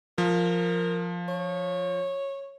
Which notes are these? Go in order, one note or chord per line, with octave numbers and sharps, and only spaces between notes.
F3 A#4
C#5